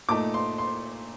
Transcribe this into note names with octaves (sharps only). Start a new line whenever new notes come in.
A#2 A3 D#4 D6
C6
C6